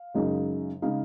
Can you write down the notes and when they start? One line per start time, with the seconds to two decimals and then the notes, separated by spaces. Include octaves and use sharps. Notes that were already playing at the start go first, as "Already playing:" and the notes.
Already playing: F5
0.14 F#2 C#3 G#3 D#4
0.82 C#3 G#3 D#4 F5